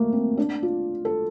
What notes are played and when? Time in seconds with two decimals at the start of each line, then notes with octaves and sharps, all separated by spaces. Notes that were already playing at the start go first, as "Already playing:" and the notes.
Already playing: A3 A#3
0.12 C4
0.37 D4
0.63 F4
1.05 A4